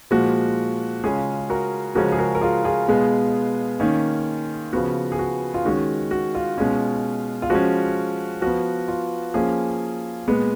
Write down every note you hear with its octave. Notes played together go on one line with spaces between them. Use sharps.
A#2 F3 G#3 F#4
C#3 G#3 C#4 F4 G#4
F#4 A#4
C#3 F3 G#3 C#4 F#4 A#4
G#4
F#4 A#4
A#4
F4 G#4
F4 G#4
B2 G#3 B3
D#3 A#3 C#4
C#3 F3 B3 F#4
G#4
F#4
F4
D#3 G#3 C#4 F#4
F#4
F4
B2 G#3 C#4
F4
F3 G#3 C#4 F#4
F3 B3 F#4
F4
F3 A#3 C#4 F4 G#4
A#2 G#3 B3